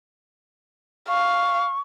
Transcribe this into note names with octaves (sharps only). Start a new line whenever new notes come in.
F5 C#6